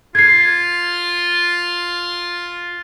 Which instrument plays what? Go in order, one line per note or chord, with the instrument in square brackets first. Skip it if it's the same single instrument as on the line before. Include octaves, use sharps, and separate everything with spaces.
[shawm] F4 [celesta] G#6 C7